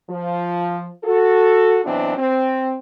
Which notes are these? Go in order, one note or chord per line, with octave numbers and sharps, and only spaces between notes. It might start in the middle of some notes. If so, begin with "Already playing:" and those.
F3
F#4 A4
B2 E3 F#3 C4 D4
C4